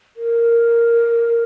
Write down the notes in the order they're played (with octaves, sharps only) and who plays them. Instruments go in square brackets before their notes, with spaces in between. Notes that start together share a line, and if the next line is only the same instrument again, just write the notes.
[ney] A#4